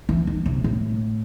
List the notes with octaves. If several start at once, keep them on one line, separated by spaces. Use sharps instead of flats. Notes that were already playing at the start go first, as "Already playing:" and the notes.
E3
D#3
C3
A2